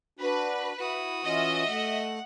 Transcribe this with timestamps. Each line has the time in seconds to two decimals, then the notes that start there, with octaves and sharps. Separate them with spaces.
0.19 D4 F#4 B4
0.79 E4 F#4 D#6
1.24 E3 C#4 F4 D#5 E5
1.67 A3 F#5